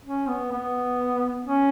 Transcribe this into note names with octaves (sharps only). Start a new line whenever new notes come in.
C#4
B3
B3
C#4